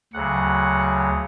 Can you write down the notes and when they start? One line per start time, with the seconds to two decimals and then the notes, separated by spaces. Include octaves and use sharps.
0.13 D2 C#3 F#3 F#5